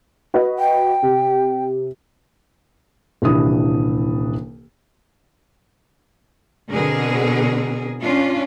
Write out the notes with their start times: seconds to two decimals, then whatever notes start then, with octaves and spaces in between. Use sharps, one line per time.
0.34 F#4 B4 D#5
0.59 G5
1.03 C3
3.22 D#1 C2 E3 D4 E4 D#6
6.72 B2 D3 C4 G#4 A#4
8.00 C#4 D4 F4